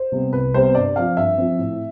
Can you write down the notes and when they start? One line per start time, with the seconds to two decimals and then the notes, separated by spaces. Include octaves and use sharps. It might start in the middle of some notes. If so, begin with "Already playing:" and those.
Already playing: C5
0.12 C3 G3 B3
0.33 C2 B4
0.54 C3 G3 B3 C5
0.75 G2 D5
0.96 F3 C4 F5
1.17 G2 E5
1.38 F3 C4
1.59 A2